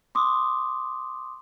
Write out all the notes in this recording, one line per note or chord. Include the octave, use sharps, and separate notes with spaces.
C6 D6 D#6